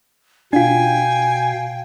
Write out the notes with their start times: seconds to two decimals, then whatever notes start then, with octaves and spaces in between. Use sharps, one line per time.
0.53 B2 D4 F4 F5 G5 G#5